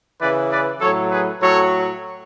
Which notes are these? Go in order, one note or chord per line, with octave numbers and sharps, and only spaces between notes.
C#3 E3 B4 D5
B4 D5
A2 F#3 A4 C#5
G#4 B4
A2 F#3 A4 C#5